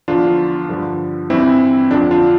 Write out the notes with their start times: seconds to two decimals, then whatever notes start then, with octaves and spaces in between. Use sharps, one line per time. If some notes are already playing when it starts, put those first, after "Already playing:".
0.08 E2 D3 F3 D4 F4
0.69 G2 D3 F3
1.30 G2 E3 C4 E4
1.90 F2 D3 F3 D4
2.11 D4 F4